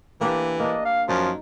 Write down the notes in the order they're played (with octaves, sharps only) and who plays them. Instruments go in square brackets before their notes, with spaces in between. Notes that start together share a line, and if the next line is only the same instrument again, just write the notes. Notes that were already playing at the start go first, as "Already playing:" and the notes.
[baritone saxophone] E3 [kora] A#3 D4 G4
[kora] A#3 D4 [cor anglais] D#5
[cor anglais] F5
[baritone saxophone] F#2 [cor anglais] F3 [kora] D#4